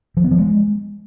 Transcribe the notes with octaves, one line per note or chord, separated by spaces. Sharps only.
F3
B3
F3
G#3